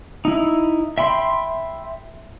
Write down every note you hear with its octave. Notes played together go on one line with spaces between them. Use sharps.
D#4 E4
E5 G5 B5 C6